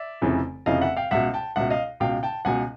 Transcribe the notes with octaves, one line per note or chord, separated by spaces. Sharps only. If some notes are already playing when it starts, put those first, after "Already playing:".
Already playing: D5 E5
F1 F2 C#3 E3
F1 F2 C#3 E3 D#5 F5
E5 F#5
F5 G5
C#2 B2 E5 F#5
G5 A5
C#2 B2 E5 F#5
D#5 F5
C#2 B2 F5 G5
G5 A5
C#2 B2 F#5 G#5